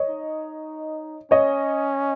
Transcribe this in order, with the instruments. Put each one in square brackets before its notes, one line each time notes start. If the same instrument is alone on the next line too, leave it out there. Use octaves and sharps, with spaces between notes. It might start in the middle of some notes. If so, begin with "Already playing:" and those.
Already playing: [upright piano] C#5 D#5
[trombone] D#4
[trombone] C#4 [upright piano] C#5 D#5